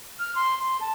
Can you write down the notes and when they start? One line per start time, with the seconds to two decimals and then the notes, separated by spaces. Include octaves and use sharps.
0.19 F6
0.35 C6
0.59 C6
0.81 A5